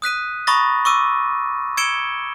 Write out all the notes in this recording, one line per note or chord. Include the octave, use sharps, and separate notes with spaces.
D#6 F#6 B6 D#7
A#5 B5 C#6 D#6 A6 A#6
C#6 D6 E6 D#7
E6 G#6 C#7 D7 E7 G7